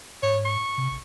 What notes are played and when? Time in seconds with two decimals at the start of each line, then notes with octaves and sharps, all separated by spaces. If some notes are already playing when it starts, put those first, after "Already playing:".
0.23 G#2 C#5
0.45 C#6
0.78 C3
0.91 G#1